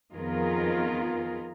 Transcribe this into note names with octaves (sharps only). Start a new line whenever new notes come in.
F2 D#3 B3 F4 G#4 A#4